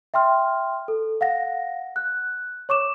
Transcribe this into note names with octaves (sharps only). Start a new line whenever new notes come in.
E5 G5 C6 F6
A4
F5 F#5 A#6
F#6
C#5 C#6 D6 E7